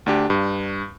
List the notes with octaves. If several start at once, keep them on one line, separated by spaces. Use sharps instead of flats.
D2 D4 G4
G2